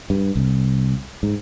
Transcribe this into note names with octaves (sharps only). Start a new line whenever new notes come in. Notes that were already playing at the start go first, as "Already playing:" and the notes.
G2
C2
G#2